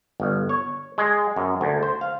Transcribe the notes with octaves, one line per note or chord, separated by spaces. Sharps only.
G1
C#5
G#3
F#2
D2
C5
F5